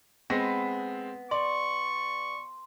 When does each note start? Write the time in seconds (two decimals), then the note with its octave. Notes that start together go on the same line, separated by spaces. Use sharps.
0.30 G#3 B3 C4 A#6
1.31 D5 C6 C#6